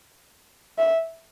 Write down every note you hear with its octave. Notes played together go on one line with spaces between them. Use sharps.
E5